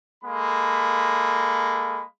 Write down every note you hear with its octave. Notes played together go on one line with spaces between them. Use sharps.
G#3 A#3 A4 B5